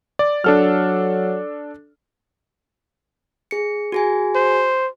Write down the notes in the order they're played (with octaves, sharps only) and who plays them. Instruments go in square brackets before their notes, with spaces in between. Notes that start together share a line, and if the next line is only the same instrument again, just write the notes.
[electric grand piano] D5
[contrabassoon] F#3 [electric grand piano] D4 A4 F6
[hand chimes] G#4 C#7
F#4 G#4 G#5
[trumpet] C5